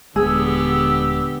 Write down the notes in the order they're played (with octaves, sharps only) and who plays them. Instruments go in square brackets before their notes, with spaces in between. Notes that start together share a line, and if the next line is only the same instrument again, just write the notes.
[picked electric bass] D#1 B1 G#3 [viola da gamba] D3 B3 G4 [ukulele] G#4 [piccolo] E6